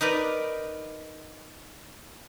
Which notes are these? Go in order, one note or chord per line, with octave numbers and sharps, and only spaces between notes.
D#4 A#4 B4 D5